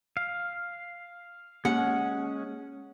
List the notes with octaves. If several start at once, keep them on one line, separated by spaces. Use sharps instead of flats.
F5
G#3 A#3 C#4 F#5